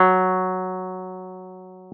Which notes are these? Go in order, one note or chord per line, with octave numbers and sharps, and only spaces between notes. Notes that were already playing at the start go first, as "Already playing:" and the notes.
Already playing: F#3